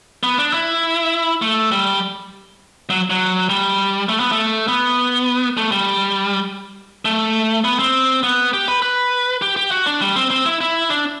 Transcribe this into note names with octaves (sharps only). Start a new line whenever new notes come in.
B3
D4
E4
A3
G3
F#3
F#3
G3
A3
B3
A3
B3
A3
G3
A3
B3
C4
B3
G4
B4
B4
G4
G4
F#4
D4
G3
C4
C4
E4
E4
D4